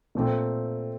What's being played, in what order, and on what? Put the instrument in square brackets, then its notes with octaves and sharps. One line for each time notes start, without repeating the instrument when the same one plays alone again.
[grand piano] A#2 A3 C4